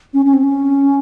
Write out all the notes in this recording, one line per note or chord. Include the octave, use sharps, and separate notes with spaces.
C#4
C#4
C4
C#4